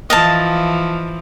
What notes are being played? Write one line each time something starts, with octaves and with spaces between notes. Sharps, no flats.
E3 F3 D#5 F5 A5